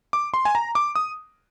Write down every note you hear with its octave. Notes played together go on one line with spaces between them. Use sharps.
D6
C6
G#5
A#5
D6
D#6